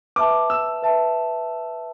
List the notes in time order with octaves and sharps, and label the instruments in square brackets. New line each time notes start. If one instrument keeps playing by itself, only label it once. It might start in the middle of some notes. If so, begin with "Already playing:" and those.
[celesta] B4 E5 A5 [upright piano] D6
[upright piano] E6
[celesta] B4 E5 A5